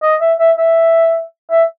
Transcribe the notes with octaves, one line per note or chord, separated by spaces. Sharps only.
D#5
E5
E5
E5
E5